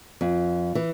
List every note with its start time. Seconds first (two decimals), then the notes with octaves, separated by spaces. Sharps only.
0.21 F2
0.75 E3